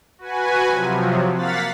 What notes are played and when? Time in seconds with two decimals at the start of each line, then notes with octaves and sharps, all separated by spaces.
0.18 F#4 B4 G#5
0.68 C3 F3 F#3
1.35 A#3 F5 F#5 A6 B6